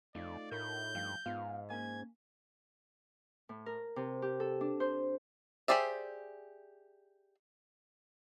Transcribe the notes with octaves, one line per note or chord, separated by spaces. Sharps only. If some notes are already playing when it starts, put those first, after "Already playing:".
F2 A3 D#4 F4 D5
A2 A#4 C#5 B5 G6
G2 F3 F5 G5
G#2 B3 F4 F5
A#3 C#4 G#5 G#6
A2
A#4
C3
G4
A4
D4
C5
G4 G#4 C5 D5 E5